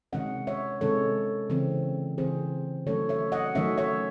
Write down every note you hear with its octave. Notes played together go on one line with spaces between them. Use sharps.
C3 D#3 G#3 C#4 D#5 F#5
C#5 E5
C3 D#3 G#3 C#4 A4 C#5
C#3 E3 C4
C#3 E3 C4 G#4 C5
D#3 F#3 A3 C#4 A4 C#5
C#5 E5
D#5 F#5
D#3 F#3 A3 C#4 C#5 E5
C#5 E5